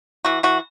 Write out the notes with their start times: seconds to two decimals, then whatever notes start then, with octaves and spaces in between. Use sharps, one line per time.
0.25 E3 F#4
0.43 E3 F#4